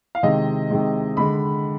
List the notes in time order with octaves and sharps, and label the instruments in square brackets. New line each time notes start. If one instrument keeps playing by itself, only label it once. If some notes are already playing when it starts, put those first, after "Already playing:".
[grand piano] F5
C3 D#3 G#3 D#5
C3 D#3 G#3
D3 G#3 B5